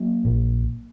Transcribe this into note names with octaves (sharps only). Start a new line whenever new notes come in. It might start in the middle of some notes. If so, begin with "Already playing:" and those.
Already playing: F#3 A#3
A#1